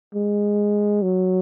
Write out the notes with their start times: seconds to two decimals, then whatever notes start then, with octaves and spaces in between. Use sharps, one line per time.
0.15 G#3
1.02 F#3